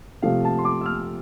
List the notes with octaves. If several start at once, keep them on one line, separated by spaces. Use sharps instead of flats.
C3 F3 A3 F5
A5
C6
D6
E6
F6